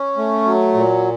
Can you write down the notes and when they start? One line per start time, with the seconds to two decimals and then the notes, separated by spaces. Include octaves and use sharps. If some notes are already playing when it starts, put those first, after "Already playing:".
Already playing: C#4
0.17 A3
0.45 F#3
0.74 A#2